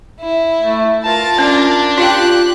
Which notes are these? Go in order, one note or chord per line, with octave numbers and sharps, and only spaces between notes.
E4
A3
F4 A#4 A5 A6
C#4 D4
F4 G4 F5 G5 F#6